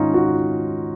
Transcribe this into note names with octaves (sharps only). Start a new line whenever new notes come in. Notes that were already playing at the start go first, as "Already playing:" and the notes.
Already playing: G#2 D#3 C#4 D#4 F4
F#4